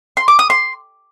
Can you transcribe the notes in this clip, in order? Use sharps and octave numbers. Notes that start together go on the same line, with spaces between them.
C6
D6
D#6
C6